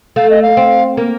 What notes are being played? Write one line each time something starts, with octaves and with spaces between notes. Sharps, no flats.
A3 F5
D#5
F5
C4
A#3